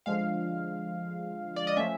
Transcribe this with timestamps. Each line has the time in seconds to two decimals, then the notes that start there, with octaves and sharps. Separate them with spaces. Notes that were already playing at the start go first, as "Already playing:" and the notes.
0.06 D3 F3 G#3 F5
1.56 D5
1.67 D#5
1.77 F3 A3 C#4 E5